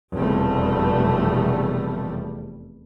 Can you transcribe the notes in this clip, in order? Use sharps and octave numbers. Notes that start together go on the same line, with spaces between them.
F1 E2 B2 G3 A3